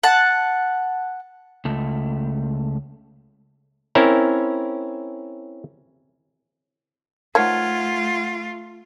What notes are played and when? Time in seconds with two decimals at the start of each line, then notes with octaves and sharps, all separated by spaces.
0.03 F#5 A5
1.65 C#2 A3
3.95 C4 C#4 E4 A#4
7.35 D#3 F3 A3 F4 C#5 F#5 F6 G#6